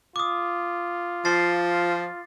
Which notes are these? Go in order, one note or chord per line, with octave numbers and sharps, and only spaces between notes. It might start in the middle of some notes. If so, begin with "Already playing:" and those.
F4 D6 D#6
F3 A6 C7